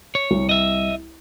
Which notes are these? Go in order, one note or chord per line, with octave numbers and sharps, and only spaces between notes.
C#5
C2
D#5 E5